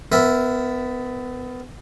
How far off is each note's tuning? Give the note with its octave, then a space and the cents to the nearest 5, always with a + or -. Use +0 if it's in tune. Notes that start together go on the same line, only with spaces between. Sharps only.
B3 +25 A#4 +0 E5 +0